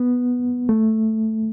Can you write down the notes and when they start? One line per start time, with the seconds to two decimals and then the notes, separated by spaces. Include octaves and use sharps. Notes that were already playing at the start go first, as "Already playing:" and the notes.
Already playing: B3
0.69 A3